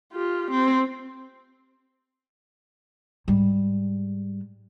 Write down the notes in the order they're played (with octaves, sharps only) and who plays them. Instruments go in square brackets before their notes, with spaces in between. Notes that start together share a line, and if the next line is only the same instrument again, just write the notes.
[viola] F4 G4
C4
[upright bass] G#2 G3